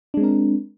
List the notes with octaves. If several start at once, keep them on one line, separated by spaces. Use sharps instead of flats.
G#3 C4 D4 A#4